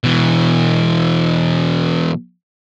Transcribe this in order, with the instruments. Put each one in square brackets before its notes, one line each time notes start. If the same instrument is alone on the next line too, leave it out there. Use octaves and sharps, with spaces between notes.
[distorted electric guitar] B2 E3